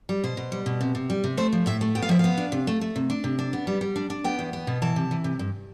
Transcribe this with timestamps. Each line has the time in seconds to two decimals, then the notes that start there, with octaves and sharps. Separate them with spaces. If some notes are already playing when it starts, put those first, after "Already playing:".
0.09 G3
0.24 B2 C5
0.37 B2
0.52 G3
0.66 B2
0.81 C3
0.95 C3
1.10 G3
1.24 C3
1.37 A3 C5
1.53 F3
1.66 A2 E5
1.81 A3
1.95 B3 G5
2.02 F5
2.09 F3 E5
2.19 B3 F5
2.38 D4
2.52 C3
2.67 A3
2.81 A3
2.96 C3
3.10 D4
3.24 C3
3.39 D4
3.53 B3
3.67 G3
3.81 G3
3.96 D4
4.10 D4
4.24 B3 G5
4.39 E2
4.53 B3
4.67 B2
4.82 E3 A5
4.96 C3
5.11 E3
5.24 C3
5.39 G2